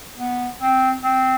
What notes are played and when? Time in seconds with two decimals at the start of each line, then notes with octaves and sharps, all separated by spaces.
0.18 B3
0.60 C4
1.03 C4